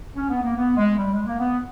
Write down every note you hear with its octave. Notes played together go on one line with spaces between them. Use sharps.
C#4
B3
A#3
B3
G#3
G3
G#3
A#3
B3